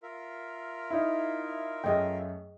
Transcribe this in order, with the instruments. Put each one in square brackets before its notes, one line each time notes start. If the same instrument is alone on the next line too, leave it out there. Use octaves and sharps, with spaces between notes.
[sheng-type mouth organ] F4 A#4 E5
[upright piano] D#4 E4
[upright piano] F#2 A3 [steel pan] G#4 D#5 G5